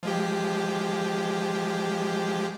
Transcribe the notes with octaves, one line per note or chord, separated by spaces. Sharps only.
F3 G#3 G4